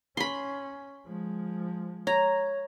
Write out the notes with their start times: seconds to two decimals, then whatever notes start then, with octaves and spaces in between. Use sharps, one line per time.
0.17 C#4 B5 C6
1.07 F3 G#3
2.07 C#5 A#5